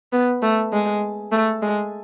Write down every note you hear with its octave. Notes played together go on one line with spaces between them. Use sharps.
B3
A3
G#3
A3
G#3